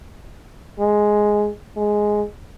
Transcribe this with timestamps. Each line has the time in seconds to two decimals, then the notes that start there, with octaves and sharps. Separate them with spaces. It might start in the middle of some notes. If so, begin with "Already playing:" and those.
0.79 G#3
1.76 G#3